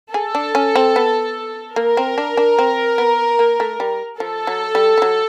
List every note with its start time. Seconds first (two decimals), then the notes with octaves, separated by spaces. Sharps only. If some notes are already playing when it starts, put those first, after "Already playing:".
0.14 G#4 A4
0.35 D4
0.55 C#4
0.76 C4
0.96 B3
1.76 A#3 A#4
1.97 C4
2.18 D4
2.37 D4
2.59 C4
2.98 B3
3.39 A#3
3.60 A3
3.80 G3
4.20 F3 A4
4.47 F#3
4.75 G3
4.98 G3
5.02 F#3